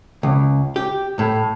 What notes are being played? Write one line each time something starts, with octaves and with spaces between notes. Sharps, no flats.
C#2
G4
A2